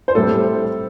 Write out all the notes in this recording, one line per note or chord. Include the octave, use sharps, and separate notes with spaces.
C5
A2 G3 C4 A4